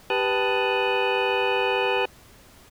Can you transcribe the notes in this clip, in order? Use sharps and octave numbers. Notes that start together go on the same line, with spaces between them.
G4 B4 A5 D#6 F#6